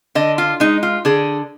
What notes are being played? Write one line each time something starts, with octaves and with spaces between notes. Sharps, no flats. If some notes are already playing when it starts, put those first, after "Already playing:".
D3 D#5
F4
G#3 D#4
F4
D3 G#4